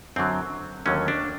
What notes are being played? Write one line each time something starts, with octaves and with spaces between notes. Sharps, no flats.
F#2 D3 F#3 C4
D#2 D3 F#3 A3 C#4
D4